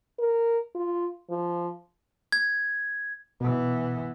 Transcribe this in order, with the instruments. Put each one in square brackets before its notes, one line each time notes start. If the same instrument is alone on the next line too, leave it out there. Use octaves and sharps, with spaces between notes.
[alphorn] A#4
F4
F3
[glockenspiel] G#6
[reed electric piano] B2 [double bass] E3 B3